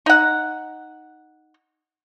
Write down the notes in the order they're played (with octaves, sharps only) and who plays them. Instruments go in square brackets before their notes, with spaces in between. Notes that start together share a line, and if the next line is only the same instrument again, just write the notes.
[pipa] D#4 F#5